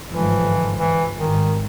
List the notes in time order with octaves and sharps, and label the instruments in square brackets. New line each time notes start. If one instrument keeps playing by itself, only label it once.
[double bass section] G1 G#2 F3 [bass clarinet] E3
[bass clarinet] E3
[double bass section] G#1 G2 [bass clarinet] D#3